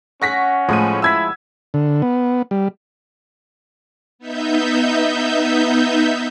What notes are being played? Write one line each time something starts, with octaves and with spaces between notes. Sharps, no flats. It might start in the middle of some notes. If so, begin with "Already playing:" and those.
C#4 F#5 C#6 A#6 B6
A2 F3 G#3 D#7
E4 E6 G#6 B6
D3
B3
G3
B3 D#4 E5 G6